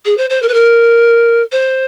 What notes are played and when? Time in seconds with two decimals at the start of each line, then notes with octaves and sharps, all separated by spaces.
0.05 G#4
0.17 C5
0.30 C5
0.42 A#4
0.48 B4
0.54 A#4
1.52 C5